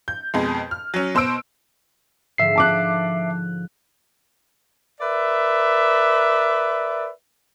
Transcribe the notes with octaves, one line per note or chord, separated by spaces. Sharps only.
G6
F2 B2 G#3
F6
F#3 C#4
B2 C5 C6 E6 D7
G#2 D3 F3 E5 C7
A5 D6 F#6
A#4 B4 D5 E5